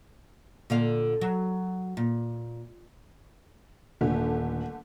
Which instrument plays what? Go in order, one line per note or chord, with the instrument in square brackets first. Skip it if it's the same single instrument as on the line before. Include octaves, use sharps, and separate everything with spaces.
[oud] A#2 D3 F5
F#3
A#2
[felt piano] D#1 [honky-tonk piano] D3 A3